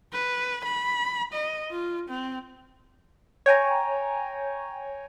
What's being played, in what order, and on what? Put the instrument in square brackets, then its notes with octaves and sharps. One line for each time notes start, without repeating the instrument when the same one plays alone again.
[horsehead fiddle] B4
B5
D#5
F4
C4
[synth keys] C#5 G5 G#5 A#5